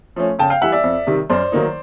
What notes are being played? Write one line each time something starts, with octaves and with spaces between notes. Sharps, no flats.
F3 A3 C#4
C#3 G5 A5
F5 G5
E3 G3 E5 F#5
D5 E5
F2
C3 D#3 G3
F#2 C5 D5
D#3 F#3 A#3 D#4